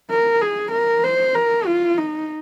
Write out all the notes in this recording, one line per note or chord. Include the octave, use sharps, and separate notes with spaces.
A#4
G#4
A#4
C5
A#4
F4
D#4